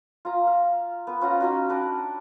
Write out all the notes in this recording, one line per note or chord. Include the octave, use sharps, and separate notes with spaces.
F4 A#5
F5
B3 B4
C#4 F4 F#5 A#5
C#4 D#4 F#4
D4 B4 F#5 G5